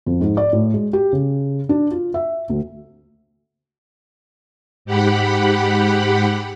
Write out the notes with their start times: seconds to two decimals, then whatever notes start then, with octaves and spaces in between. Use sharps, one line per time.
0.06 F2
0.21 G#2
0.37 D5
0.53 A2
0.74 G#3
0.93 G4
1.13 C#3
1.69 D4
1.91 F4
2.14 E5
2.49 D2
4.85 G#2 G4 F#5 B5